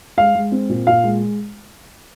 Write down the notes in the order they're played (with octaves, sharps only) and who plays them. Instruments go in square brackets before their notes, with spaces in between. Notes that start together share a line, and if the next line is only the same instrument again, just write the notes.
[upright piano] G#3 [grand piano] F5
[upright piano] G#3
C4
A#2
[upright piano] A#2 [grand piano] F5
[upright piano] G#3